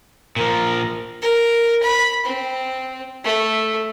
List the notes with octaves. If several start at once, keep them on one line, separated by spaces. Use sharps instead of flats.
A#2 F3 A#4
A#4
B5
C4
A3